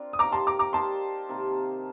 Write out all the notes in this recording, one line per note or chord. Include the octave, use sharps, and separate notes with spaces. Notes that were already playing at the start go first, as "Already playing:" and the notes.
Already playing: C4 D4 F4 A#4
D#6
F3 A#3 D#4 G4 A#5 D6
A5 C6
A#5 D6
A#5 D6
A#3 D#4 G4 D5 A5 C6
C3 D#3 A#3